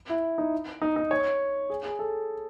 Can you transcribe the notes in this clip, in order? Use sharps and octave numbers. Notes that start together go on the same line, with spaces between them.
E4
D#4
D#4
D#4
C#5
G#4
G#4
A4